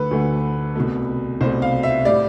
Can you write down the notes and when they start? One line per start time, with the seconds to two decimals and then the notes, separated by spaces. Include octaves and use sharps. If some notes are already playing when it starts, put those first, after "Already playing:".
Already playing: D2 D3 A3 A4 B4
0.11 D2 D3 A3
0.75 C2 B2 A3
1.41 C2 B2 A3 C5
1.62 F5
1.83 E5
2.05 A2 G3 D5